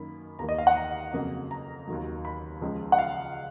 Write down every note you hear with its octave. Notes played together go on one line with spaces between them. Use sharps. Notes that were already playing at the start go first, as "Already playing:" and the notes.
Already playing: F#2 D#3 A#3 B5
D#2 D#3 A#3 A#5
D#5
F5
F#5
A#5
F2 C#3 F#3 A#3
A#5
D#2 D#3 F#3
B5
C#2 C#3 F3 G#3
F#5
F5